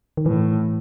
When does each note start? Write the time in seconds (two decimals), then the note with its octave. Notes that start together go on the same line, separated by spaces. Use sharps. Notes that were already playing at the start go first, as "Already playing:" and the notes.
0.17 D#3
0.26 A2 E3